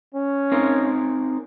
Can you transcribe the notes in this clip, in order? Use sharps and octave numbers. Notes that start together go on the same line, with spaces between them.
C#4
C4 D#4 A#4